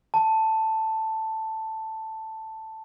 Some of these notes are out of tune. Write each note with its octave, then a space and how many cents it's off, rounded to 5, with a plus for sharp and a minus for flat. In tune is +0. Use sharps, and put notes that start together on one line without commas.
A5 +5